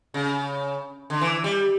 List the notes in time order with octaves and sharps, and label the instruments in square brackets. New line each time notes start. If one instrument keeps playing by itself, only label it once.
[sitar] C#3
D3
E3
G3